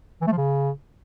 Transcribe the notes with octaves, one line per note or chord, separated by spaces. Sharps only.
E3
A3
F3
C#3